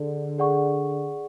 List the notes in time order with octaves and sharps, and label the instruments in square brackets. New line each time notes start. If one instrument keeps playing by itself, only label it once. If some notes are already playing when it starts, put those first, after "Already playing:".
Already playing: [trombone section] D3 [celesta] D4 G#4
[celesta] G#4 D5 F#5 C#6